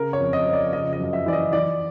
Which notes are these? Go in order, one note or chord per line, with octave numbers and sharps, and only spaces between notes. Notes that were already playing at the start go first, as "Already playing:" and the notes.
Already playing: C#3 A#4
C#5
F2
D#5
F3
D5
C#3 D#5
D#5
F#2
E5
E3 D5
D#5
E3 D5